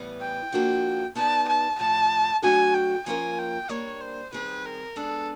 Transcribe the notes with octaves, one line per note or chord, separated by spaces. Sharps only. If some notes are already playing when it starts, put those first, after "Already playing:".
Already playing: A2 E3 G3 B3
G5
F3 A#3 D4 F#4 A4
B3 D#4 G4 B4 D5 A5
A5
A2 F3 A3 A5
F#3 A3 D4 F#4 A4 G#5
G5
F3 A#3 C#4 F4 A#4 G#5
G5
G3 A#3 D4 C#5
C5
D#3 G3 C4 D#4 G#4 B4
A#4
G#3 B3 D4 A4